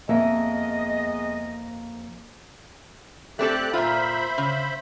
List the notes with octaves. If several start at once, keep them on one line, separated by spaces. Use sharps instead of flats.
F2 G#3 A#3 B3 D#5 E5
A3 C4 G4 A4 D5 F#6
A#2 F4 C5 E5 B5
C#3